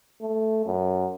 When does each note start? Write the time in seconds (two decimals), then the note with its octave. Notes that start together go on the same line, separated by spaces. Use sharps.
0.22 A3
0.66 F#2